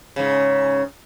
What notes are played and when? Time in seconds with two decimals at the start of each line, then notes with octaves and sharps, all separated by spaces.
0.16 G#2 C#3